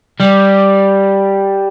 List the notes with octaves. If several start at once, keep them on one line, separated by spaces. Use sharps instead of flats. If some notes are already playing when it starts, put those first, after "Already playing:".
G3